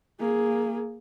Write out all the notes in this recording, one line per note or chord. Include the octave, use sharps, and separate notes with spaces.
A#3 G#4